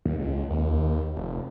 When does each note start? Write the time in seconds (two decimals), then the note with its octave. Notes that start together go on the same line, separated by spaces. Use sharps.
0.06 D#2
0.19 C#2
0.50 D#2
1.17 F1